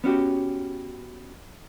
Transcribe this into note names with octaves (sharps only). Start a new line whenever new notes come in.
B3 C#4 F#4 G4